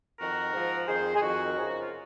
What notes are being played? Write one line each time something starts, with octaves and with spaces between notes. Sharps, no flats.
F2 D#3 F#4 A#4
G#2 F3
F2 D#3 G#4 C5
G#4
F2 D#3 D#4 F#4
A#4
F#2 C#3 F3 G#4
F#4
F4